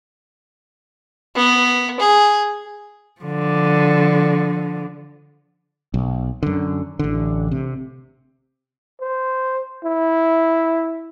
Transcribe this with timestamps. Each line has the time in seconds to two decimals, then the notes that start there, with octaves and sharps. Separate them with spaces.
1.35 B3
2.00 G#4
3.21 D3 F3
5.94 B1
6.43 F#2 D3
6.99 A1 D3
7.51 C3
9.01 C5
9.84 E4